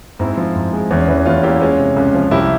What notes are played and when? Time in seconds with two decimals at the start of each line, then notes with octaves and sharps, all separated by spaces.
0.19 G#2 C4 E4
0.37 F3
0.56 G#2
0.73 G#3
0.91 E2 C#4
1.08 E3 C#4
1.26 E2 C#4 F4
1.43 A#3 E4 G4
1.61 G#3 C#4 F4
1.79 C3
1.96 C#2
2.14 F3
2.31 C2 E4 G4